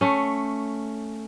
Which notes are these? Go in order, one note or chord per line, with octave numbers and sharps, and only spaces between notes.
A3 C#4